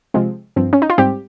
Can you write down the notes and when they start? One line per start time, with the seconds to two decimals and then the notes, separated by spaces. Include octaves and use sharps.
0.14 C3 F3 G#3 C4
0.56 G2 F3 C4
0.73 C#4
0.82 D#4
0.90 F4
0.98 G#2 G3 C4 G4